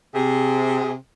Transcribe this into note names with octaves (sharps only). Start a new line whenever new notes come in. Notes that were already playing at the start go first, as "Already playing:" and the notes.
C3 G#4